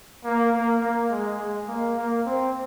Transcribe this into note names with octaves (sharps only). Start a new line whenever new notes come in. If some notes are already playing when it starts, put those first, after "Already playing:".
A#3
A#3
A#3
G#3
G#3
A#3
A#3
C4